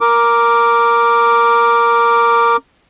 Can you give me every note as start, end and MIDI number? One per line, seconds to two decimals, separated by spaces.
0.01 2.57 70
0.01 2.57 86